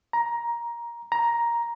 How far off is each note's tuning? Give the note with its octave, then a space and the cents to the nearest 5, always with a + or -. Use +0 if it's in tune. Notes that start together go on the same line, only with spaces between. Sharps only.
A#5 +15
A#5 +10